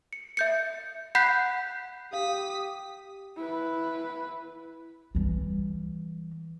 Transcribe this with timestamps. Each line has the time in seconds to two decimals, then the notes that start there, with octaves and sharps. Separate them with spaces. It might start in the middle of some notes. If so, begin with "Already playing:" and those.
0.13 C#7
0.37 E5 G6 C#7
1.15 F#5 B5 F#6 G6 B6 C7
2.13 G4 F5 D#6 B6
3.37 E4 B4
5.15 E3 G3